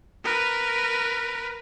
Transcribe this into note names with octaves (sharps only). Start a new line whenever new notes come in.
A#4 B4